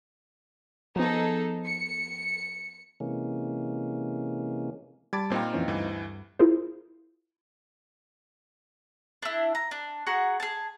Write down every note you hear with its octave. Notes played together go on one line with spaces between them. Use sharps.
F3 B3 D#4 G#4 A4
C#7
C3 E3 G#3 A#3 C#4
G3 A5 B5 D6 G#6 A6
A#2 C4 D#4 F4 G5
F2 E3 C#4
D2 G2 E3
E4 F4 G#4 A#4 C5
D4 E4
A#5
D4
F#4 G#4 F#5 A#5
G#4 A5